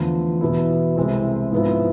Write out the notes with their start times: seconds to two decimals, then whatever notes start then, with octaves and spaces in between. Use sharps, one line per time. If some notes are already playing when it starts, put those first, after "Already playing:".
Already playing: E2 D3 F3 A3
0.41 E2 B2 B3 E4
0.96 C2 C3 G#3 C4 E4
1.52 G#2 F3 B3 E4